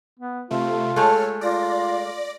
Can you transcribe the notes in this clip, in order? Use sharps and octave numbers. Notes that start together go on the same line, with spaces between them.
B3
C3 A3 F4
G#3 A3 A4 C#5 F6
F4 D5 A#6